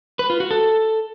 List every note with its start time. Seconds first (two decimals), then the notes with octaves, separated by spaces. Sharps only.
0.19 B4
0.30 F4
0.40 F#4
0.51 A4